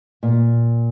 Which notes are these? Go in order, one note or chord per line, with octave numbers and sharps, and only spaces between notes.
A#2